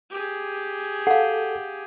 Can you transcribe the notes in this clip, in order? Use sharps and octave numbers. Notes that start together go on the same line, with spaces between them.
G4 G#4
A4 F5 F#5